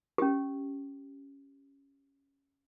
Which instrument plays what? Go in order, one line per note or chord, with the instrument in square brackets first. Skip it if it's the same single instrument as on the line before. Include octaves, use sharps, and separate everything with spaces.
[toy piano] C#4 G4